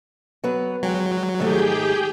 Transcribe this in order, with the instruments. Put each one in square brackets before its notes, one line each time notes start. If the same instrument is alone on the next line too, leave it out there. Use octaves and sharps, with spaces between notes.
[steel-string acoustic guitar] F#3 B3 B4
[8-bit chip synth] F#3 [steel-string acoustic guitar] G#3 G5
[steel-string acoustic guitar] G#2 D#3 A3 [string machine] G4 G#4 G5